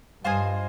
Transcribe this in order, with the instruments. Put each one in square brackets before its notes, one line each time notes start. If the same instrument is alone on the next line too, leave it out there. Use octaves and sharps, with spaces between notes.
[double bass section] G2 [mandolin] F4 C5 D#5 G#5